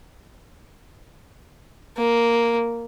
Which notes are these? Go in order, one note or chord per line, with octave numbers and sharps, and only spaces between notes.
A#3